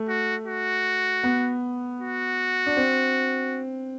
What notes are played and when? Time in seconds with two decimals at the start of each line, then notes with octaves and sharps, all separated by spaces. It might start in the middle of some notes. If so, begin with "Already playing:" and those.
Already playing: A3
0.09 F#4
0.47 F#4
1.24 B3
2.01 F#4
2.66 D4
2.77 C4